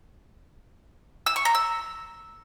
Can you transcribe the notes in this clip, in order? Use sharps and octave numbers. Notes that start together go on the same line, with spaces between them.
E6
C#6
A#5
E6